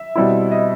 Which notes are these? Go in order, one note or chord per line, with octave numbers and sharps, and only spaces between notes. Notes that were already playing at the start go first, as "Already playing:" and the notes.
Already playing: E5
B2 G3 C4 E4
D#5